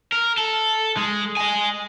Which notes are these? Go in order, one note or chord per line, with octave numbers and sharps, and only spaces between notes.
A#4
A4
G#3
D#5 G#5